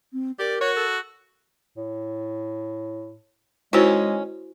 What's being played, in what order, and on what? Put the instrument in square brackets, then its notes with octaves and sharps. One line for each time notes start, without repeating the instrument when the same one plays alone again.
[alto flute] C4
[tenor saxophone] G4 [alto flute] A#4 [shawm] D5
[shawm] F#4 [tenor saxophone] C#5
[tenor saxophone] A4
[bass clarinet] A2
[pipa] D#3 C#4 [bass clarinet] G#3 [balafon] E4 F#4 C5